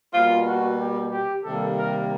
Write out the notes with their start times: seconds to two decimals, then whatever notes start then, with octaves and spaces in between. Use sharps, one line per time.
0.13 B2 G3 A#3 F4
0.46 F#4
0.78 G4
1.10 G4
1.42 C3 D#3 G3 A#3 A4
1.75 A#4